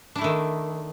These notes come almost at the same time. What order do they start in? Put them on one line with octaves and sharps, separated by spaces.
D4 E4 A3 D#3